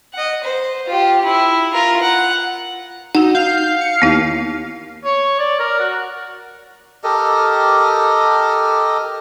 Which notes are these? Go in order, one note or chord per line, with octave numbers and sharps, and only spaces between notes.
D#5 F#5
C5
F4 G4
E4
F4 A#4
F#5
D#4 F#4 F#5
F5 G6
C#7
D#2 B3 E4
C#5
D5
A#4
F#4
G4 A4 A#4 D#5